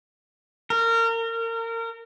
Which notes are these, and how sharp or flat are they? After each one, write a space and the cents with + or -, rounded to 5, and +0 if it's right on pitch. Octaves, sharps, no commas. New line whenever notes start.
A#4 -30